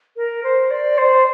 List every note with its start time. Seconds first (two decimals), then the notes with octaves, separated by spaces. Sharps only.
0.17 A#4
0.44 C5
0.71 D5
0.98 C5